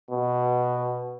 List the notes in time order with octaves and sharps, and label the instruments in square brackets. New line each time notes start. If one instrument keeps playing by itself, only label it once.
[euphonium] B2